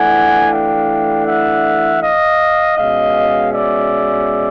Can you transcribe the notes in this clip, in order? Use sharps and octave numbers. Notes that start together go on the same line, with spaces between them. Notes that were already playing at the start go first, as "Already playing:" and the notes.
Already playing: E3 A3 D4 F#5 G#5
F5 G5
E5 F#5
D#5 F5
B2 G#3 C#4 D#5 F5
D5 E5